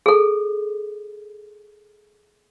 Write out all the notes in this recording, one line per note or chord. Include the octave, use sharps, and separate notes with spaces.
G#4 A4